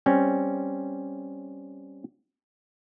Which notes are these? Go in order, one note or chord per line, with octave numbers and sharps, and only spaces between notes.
G3 C4 C#4